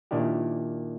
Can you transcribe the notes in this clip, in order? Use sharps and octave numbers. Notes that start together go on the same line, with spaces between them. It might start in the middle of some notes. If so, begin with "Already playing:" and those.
A#2 D#3 D4 E4 G4